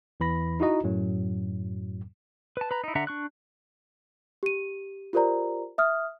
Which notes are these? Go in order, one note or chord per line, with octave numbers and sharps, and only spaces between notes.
E2 E3 B5 A#6
D#4 E4 F#4 D#5 A#5
F#2 A2 F#3
B4 A5
B4 A#5
D#4 E4
D3 D4 E5 F#5 A#5
D4 C#6 F#6
G4 D#7
F4 G4 A#4 C5 D5 A#5
E5 D#6 F6